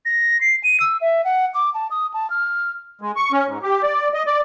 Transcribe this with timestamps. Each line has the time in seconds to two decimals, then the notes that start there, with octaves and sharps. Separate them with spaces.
0.05 A#6
0.41 C7
0.64 D#7
0.80 E6
1.01 E5
1.25 F#5
1.55 D6
1.74 A5
1.91 D#6
2.14 A5
2.30 F6
3.01 G#3
3.16 C#6
3.32 C#4
3.47 G#2
3.62 G4
3.83 D5
4.14 D#5
4.26 D5